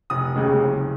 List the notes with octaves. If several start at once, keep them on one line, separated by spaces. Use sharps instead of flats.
F1 D#6
D#2 C#3 G#3
F#1